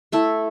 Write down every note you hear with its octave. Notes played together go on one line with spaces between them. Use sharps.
A3 E4 A4